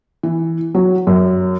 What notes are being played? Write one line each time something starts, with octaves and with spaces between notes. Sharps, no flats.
E3
F#3
F#2